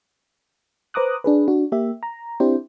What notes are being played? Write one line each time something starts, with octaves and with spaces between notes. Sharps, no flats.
B4 C5 A#5 D6 D#6 F#6
D4 G#4 B4
D4 F#4
A#3 G4 E5
A#5
C4 D4 E4 G4 C5